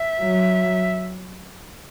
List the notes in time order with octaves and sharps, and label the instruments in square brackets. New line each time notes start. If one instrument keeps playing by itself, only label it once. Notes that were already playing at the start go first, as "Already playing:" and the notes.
Already playing: [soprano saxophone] E5
[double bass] F#3